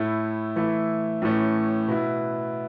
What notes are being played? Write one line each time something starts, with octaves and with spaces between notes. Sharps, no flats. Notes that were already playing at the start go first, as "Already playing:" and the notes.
Already playing: A2 A3 E4
E3 A3 E4
A2 E3 A3 C#4
B2 B3 E4